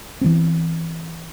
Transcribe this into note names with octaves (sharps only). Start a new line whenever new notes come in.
E3 F3 B3 C4